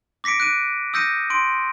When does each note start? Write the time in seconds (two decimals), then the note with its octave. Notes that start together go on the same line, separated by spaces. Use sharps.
0.24 D6 A#6 B6 C#7 D7
0.40 F#6 D7 D#7
0.94 D#6 E6 G6 A#6 C#7 D#7
1.30 C6 D7